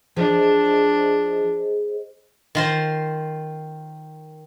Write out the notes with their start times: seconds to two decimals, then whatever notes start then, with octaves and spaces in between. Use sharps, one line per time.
0.17 F3 D4 G#4 C5 D#5
2.55 D#3 F4 C5